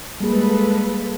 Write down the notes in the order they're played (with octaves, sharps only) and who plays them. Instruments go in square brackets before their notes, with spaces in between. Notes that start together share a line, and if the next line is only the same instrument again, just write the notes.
[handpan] G3 A#3 G#4 [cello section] G#3 A4 B4